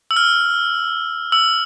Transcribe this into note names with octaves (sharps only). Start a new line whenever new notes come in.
E6
F6
E6